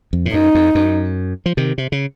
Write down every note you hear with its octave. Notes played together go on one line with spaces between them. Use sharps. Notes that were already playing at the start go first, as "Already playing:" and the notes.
F2
A2
F#2 D#4
F2
F#2
F3
C3 D#3
C3
C#3